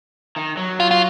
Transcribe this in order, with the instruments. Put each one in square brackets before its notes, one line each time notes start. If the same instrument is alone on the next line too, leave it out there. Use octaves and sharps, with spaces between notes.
[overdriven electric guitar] D#3
F#3
[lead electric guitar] F4
F4